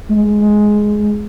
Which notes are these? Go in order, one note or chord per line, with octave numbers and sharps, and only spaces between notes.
G#3